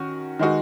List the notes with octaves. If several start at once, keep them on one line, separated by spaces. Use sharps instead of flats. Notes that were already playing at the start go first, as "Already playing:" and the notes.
Already playing: D#3 C#4 F#4
D#3 G#3 D#4 F#4